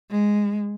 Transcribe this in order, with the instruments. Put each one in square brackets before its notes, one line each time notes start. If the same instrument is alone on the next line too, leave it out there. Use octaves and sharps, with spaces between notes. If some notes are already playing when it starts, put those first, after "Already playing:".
[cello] G#3